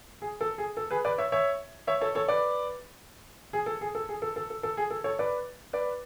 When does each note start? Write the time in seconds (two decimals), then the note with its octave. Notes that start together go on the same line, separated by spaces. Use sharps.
0.22 G#4
0.41 A4
0.58 G#4
0.77 A4
0.91 G#4 B4
1.05 B4 D5
1.18 C#5 E5
1.32 C#5 E5
1.87 C#5 E5
2.01 A4 C#5
2.15 A4 C#5
2.28 B4 D5
3.53 G#4
3.66 A4
3.81 G#4
3.95 A4
4.09 G#4
4.22 A4
4.36 A4
4.50 A4
4.63 A4
4.77 G#4
4.90 A4
5.04 A4 C#5
5.19 B4 D5
5.73 B4 D5